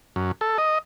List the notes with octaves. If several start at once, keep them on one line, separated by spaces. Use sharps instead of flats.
F#2
A4
D#5